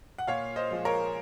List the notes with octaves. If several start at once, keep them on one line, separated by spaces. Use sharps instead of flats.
F#5
A#2 C#5 F5
C5 D#5
F3 G#3
A#4 C#5